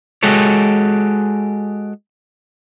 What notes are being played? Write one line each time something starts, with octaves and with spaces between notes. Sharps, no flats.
G#3 F#4 G4 A4 C#5